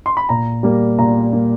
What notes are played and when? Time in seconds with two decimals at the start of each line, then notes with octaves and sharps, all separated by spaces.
0.06 C6
0.17 B5
0.29 A#2 A#5
0.63 G3 A#3
0.98 A#2 A#5
1.33 G3 A#3